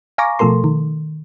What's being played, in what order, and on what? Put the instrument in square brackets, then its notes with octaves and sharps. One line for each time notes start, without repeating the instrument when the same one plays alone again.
[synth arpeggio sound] F5 G#5 A#5 C#6 D6 A#6
B2 F3 A3 A4 A#4 C6
D#3